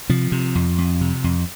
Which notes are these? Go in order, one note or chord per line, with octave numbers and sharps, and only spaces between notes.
C3 F3
C3
F2
F2
C3
F2